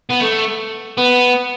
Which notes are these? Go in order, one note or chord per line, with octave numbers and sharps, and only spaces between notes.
B3
A3
B3